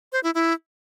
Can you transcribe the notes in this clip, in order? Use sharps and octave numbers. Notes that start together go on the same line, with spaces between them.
C5
E4
E4